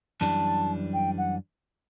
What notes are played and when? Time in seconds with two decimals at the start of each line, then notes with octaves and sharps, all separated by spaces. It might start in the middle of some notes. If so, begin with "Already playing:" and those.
0.21 F#2 E3 G3 D4 A5
0.93 G5
1.18 F#5